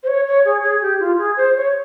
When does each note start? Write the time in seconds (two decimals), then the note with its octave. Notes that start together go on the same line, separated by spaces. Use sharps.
0.03 C5
0.08 C#5
0.27 C#5
0.45 G#4
0.63 G#4
0.82 G4
1.00 F4
1.18 G#4
1.37 C5
1.56 C#5